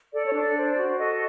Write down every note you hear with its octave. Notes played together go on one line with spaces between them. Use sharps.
A4 D5
C#5
D4 D5
C5
F#4
A4 D#5